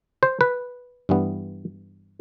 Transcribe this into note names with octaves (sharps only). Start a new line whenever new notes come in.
C5
B4
G2 E3 G3 B3